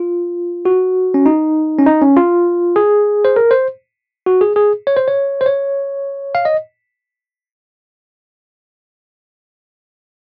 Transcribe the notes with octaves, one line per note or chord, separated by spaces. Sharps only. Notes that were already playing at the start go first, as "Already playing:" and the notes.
Already playing: F4
F#4
C#4
D#4
C#4
D#4
C#4
F4
G#4
C5
A#4
C5
F#4
G#4
G#4
C#5
C5
C#5
C5
C#5
F5
D#5